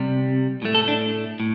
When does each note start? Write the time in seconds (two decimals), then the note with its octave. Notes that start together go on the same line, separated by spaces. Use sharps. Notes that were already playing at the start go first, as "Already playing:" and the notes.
Already playing: C3 G3
0.62 A2 A3
0.75 A4
0.88 D4
1.40 A2